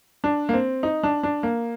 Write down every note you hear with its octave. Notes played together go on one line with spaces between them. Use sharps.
D4
A#3
C4
D#4
D4
D4
A#3